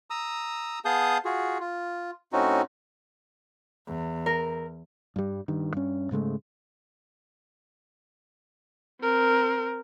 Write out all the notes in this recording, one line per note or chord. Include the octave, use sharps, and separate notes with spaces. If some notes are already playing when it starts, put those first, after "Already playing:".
A#5 D#6 E6
B3 G#4 F5 A5 D#6 G6
F4 F#4 G#4
F4
A2 C4 C#4 D#4 F#4
E2
A#4
G2 G3
G2 D#3
G2 C#4
G#2 C#3 G#3 A3
C4 A#4